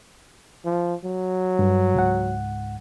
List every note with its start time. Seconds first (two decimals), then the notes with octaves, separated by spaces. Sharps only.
0.65 F3
1.04 F#3
1.59 G2
1.94 C#2 G#2 F#5